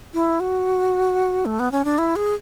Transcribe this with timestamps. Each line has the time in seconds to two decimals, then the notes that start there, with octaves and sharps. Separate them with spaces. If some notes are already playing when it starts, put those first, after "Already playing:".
0.14 E4
0.40 F#4
1.45 A3
1.59 B3
1.72 C#4
1.85 D4
1.98 E4
2.16 G#4